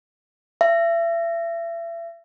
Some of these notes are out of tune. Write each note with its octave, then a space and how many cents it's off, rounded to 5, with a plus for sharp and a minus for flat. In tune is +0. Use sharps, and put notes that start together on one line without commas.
E5 +35